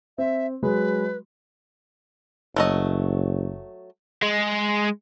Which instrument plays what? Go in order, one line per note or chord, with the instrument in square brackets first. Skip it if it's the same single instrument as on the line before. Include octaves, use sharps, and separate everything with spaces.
[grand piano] C4 [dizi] E5
[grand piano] F#3 G#3 B5 [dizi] B4
[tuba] F#1 [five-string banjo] F#3 A3 D#5
[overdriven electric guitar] G#3